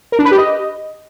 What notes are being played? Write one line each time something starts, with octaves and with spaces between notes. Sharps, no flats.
A#4
D4
B4
G4
D#5